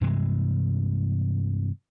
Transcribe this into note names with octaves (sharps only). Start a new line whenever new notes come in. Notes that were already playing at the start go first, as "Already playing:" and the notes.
G2 C3 E3 G#3